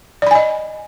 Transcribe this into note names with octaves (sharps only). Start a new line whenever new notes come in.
D5 D#5 G#5 B5